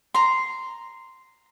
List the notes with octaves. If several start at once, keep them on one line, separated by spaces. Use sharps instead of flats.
A#5 C6